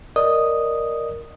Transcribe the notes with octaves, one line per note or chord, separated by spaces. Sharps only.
A#4 D5 D#5 D#6